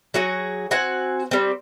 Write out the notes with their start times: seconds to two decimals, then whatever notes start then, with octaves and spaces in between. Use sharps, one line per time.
0.14 F#3 F#4 G#4
0.71 C4 F#4 F#5 G#5
1.31 G3 C4